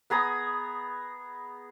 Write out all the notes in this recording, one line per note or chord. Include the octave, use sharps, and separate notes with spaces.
B3 G#4 A#5 D#6